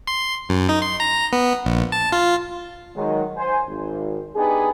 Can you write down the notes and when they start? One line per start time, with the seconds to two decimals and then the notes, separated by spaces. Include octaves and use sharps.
0.07 C6
0.49 F#2
0.69 D#4
0.82 C6
1.00 A#5
1.33 B3
1.65 A#1
1.92 A5
2.12 F4
2.96 D#3 F#3 G#3
3.36 C5 G#5
3.67 G#1
4.35 B3 D4 D#4 G4 G#4